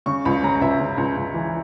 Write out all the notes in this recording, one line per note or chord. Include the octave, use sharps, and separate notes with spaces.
C#3 C#6
C#2 B5
C#3 A#5
C#2 E5
C#3
C#2
C#2
E3